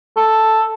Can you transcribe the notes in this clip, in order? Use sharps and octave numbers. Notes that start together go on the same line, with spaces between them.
A4